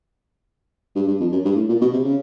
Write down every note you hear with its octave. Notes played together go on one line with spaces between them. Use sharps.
G2
G2
F2
F#2
G2
A2
A#2
B2
C3
C#3